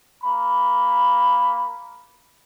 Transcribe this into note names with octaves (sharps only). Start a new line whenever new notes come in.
A#3 B5